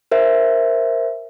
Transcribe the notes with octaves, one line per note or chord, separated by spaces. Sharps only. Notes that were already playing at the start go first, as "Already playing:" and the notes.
A#4 C5 E5